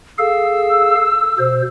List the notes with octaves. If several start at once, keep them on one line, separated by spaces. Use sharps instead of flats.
G#4 A4 F5 E6
B2 C5